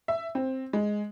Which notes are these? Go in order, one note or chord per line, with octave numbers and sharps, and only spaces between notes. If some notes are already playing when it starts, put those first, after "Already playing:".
E5
C4
G#3